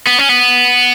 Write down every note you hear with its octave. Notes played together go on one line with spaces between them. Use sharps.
B3
C#4
B3